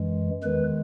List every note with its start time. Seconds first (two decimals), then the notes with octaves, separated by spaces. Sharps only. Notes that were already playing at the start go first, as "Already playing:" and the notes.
Already playing: F#2 E3 G#3
0.43 E2 D#3 G#3 B4